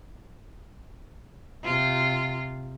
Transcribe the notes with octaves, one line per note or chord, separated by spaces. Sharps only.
C3 F4